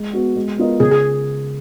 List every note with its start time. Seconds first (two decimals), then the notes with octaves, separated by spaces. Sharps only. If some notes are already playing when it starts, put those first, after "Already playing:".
Already playing: G#3
0.13 B3 F#4
0.36 G#3
0.58 B3 F4 A#4 D#5
0.80 C#3 G#4
0.91 G#4